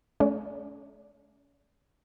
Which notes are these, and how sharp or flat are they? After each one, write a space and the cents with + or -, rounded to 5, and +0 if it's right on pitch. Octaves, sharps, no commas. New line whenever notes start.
A3 -40 C#4 +25 D5 -10